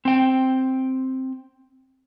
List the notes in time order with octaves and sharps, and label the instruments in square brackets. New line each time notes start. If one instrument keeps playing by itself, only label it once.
[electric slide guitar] C4 G5